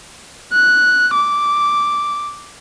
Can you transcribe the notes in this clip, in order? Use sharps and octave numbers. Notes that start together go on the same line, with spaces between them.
F#6
D6